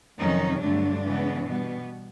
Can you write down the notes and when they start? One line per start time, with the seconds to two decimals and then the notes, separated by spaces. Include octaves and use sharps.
0.20 F2 C3 D#3 F#3 C#4 D#4
0.62 G2 D3 F#3 A3 D4
1.04 C#3 E3 G#3 B3
1.46 B2 G3 B3